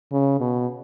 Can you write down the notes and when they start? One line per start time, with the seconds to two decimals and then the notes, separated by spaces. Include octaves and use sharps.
0.13 C#3
0.41 B2